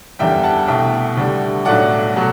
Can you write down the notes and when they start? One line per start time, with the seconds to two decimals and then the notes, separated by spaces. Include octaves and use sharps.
0.19 F#1 E2 D3 G3 E5 G5
0.43 F#5 A5
0.68 C2 B2 A3 E5 G5
1.17 D2 D3 G3
1.65 B1 A2 F#3 A3 D5 F#5
2.14 B2 F#3 A3